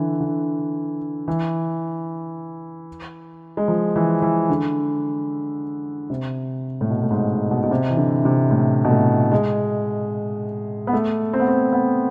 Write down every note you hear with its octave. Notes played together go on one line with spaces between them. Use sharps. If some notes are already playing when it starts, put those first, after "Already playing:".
Already playing: D3 E3
D3
E3
G#3
F3
E3
E3
D3
C3
A2
B2
A2
G#2
B2
B2
C3
E3
D3
C3
A2
B2
A2
G#3
B3
A3
C4
B3
C4
B3